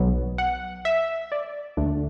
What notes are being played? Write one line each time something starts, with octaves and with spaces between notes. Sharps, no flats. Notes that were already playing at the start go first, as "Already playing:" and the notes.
Already playing: B1 B2 F#3 B3
F#5
E5
D5
D2 D3 A3 D4